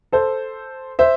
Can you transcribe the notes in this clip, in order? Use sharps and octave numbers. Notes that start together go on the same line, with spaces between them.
A4 C5
C5 E5